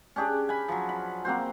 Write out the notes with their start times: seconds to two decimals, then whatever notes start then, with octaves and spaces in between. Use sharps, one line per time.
0.16 C#4 D4 G4 G#4
0.49 G#5 B5
0.68 F3 F#3
0.89 B5
1.25 A#3 C4 F#4 C5